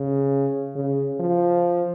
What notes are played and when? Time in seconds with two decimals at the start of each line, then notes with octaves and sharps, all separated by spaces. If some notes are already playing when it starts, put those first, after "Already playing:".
Already playing: C#3
0.76 C#3
1.20 F3